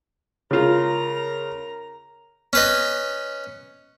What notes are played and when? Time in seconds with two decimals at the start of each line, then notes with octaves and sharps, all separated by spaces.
0.51 C#3 F4 A#4 A#5
2.53 C#4 B4 D#5